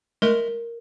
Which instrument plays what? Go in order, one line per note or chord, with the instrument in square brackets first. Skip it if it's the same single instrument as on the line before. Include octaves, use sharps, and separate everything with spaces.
[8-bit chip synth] G#3 A3 [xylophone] A#4